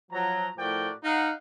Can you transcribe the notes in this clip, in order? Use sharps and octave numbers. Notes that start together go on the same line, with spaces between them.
F3 F#3 A#5
A2 F3 F#4 A#4 D5 G5
D#4 F5 F#5